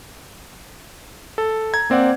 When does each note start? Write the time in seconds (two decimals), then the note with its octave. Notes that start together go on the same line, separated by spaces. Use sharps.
1.38 A4
1.73 A#5 G#6
1.90 A#3 C4 D5 F#5